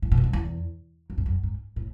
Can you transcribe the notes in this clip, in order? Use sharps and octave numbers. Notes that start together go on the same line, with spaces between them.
A2
B2
E2
F#2
E2
F#2
G#2
F#2
G#2
A2